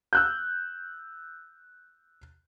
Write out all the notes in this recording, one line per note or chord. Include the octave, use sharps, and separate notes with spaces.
E6 F#6 G6